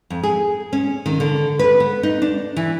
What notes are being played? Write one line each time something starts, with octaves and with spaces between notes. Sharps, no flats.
F2
G#4
C#4
D#3
D3
B4
B3
D#4
D4
E3